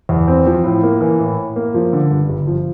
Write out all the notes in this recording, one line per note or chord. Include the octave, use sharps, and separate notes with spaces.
E2
C4
F3
A2
A#3
E3
A2
A2
A#3
F3
D3
G2
G1
F3